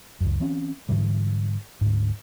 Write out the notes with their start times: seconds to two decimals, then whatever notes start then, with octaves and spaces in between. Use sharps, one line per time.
0.21 C#2 F#2
0.40 E3 C4 C#4
0.89 G#2 D3 E3 G3
1.81 D2 G#2